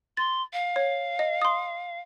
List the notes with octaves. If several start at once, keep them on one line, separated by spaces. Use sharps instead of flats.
C6 A6
F5
C#5
D#5
C6 D#6